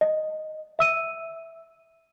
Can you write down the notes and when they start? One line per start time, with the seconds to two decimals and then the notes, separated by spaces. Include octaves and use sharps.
0.01 D#5
0.79 E5 E6 D#7